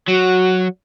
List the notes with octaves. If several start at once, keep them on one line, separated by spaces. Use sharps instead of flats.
F#3 F#4